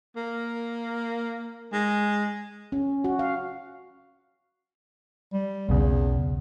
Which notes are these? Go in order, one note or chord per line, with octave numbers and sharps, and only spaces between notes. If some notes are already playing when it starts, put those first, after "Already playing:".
A#3
G#3
C#4
F#4
F5
G3
B1 E2 C#3